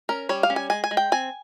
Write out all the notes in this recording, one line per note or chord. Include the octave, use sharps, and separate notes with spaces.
C#4 A#4
G3 C#5
F5
C#4
G#5
G#3 G#5
G#5
G#3
G5
C4 G#5